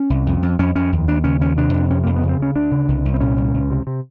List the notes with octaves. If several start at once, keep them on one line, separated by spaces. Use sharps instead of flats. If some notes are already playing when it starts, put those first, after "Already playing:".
Already playing: C#4
C2
F2
F2
F2 C#4
F2 C#4
D#2
D#2 D4
C#3 C#4
D#2 C#4
C3 D4
F2
C3 C#4
F2 A#3
B3
C#3
C4
D2 C#4
D2 D4
C#3
C2
C2
C4
A#2 C#4
C2
C#2
C3
C3